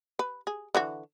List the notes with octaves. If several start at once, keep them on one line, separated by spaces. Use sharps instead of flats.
B4
G#4
D3 E3 F#4